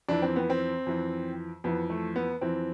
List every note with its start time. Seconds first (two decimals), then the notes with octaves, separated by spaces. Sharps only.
0.08 F2 E3 D4
0.22 C4
0.36 B3
0.50 C4
0.86 F2 E3
1.64 F2 E3 B3
1.90 A3
2.16 B3
2.41 F2 E3 C4